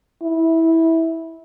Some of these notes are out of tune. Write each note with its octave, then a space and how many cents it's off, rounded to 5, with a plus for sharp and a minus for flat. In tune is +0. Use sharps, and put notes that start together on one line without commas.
E4 -15